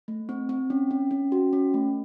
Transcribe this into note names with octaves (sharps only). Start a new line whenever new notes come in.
A3
C4
C4
C#4
C#4
C#4
F#4
C#4
A3